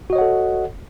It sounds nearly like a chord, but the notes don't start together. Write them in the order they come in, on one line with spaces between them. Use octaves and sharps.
F#4 D#5 C#5 F#5 A4